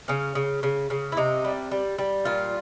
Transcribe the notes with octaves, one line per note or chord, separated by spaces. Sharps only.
C#3 C#4
C#3
C#3
C#3
E4
C3 D#4
G3
G3
G3
A#2 F4